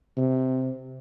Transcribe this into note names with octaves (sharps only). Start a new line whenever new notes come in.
C3